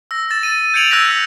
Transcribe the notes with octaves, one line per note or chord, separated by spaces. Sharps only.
E6 A#6
E6 A6 E7
D#7
G6 G#6 C#7 D7 F7 F#7
E6 F#6 G6 A#6 B6